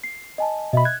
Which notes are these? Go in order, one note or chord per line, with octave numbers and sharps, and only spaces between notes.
C7
D#5 G#5 A5
B2 D#5 E5 B5
F#6 G#6